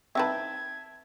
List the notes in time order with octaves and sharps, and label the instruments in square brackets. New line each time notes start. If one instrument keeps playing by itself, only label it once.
[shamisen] C4 D#4 B4 [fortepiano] E5 G5 A5 [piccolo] G#6